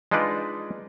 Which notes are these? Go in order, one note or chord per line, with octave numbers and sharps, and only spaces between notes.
G#3 D4 D#4 F4 B4 D5